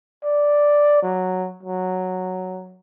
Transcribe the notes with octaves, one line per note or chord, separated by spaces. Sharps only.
D5
F#3
F#3